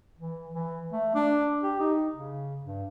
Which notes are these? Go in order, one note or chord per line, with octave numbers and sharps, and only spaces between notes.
E3
E3
A3
D4
G4
D#4
C#3
G2